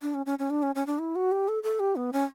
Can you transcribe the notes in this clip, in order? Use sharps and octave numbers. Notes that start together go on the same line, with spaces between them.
D4
C#4
C#4
C#4
D4
C#4
C#4
D4
E4
F#4
G4
A4
A4
G4
B3
C#4